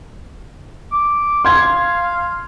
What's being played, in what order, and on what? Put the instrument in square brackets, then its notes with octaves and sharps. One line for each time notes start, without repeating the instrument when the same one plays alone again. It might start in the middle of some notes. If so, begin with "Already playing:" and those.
[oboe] D6
[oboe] F5 [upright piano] C6 G#6